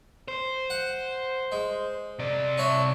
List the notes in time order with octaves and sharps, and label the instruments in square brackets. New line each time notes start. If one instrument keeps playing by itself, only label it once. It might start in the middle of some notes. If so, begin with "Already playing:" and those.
[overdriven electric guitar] C5
[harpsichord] F#5
G#3
[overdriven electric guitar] C3 D5
[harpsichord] C#4 D4 E5